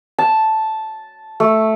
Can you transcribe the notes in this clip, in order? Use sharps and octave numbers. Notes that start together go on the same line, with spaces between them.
A5
A3